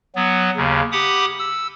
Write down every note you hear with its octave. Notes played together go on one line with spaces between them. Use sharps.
F#3 B3
D#2 C#3
G4 F#5 B5 D6 D#6
E6